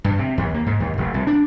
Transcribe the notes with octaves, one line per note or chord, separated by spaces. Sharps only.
G2
C3
D#2
A#3
G#2
D#2
F1
C2
D4